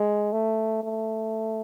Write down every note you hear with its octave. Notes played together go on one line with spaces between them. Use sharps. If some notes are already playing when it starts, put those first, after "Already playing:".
Already playing: G#3
A3
A3